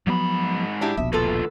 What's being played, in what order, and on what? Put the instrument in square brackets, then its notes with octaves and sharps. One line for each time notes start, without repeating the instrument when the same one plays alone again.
[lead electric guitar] G#2 B5 [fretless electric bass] F3 F#3 B3
[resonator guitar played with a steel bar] D4 E4 G4
[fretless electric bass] D#1 A#1 B2 [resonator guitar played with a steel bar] E5
[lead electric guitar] D2 F4 [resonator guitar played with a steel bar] A4 B4